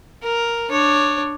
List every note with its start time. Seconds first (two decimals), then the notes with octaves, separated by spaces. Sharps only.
0.23 A#4
0.70 D4 C#5